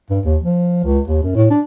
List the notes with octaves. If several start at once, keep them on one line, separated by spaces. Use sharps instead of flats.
G2
D#2
F3
C#2
D#2
F#2
A2
D4